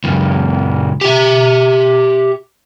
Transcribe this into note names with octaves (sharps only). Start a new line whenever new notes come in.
C#2 F#2
G4 E5